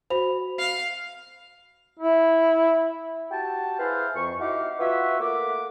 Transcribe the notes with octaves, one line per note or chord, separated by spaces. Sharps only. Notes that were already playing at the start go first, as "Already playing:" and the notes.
F#4 C5 B5 F7
F5
E4
F#4 G4 G5 A5
E4 G#4 B4 C5 F5
F2 C#6
D#4 E4 F#4 G4 F5 D6
F4 F#4 B4 C#5 E5
A3 A#3 F#5 D6